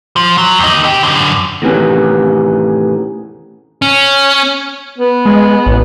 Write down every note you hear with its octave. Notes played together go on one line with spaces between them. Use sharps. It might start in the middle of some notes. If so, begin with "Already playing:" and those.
F3
F#3
D#2 D#4
C3 G4
F#2 D3
E2 A2 C3 D#3 B3 C#4
C#4
B3
G#3
A1